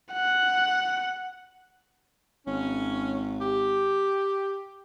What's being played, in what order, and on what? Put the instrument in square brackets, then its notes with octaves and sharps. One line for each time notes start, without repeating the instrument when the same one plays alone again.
[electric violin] F#5
[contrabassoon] G#1 [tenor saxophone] C#4
[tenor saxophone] G4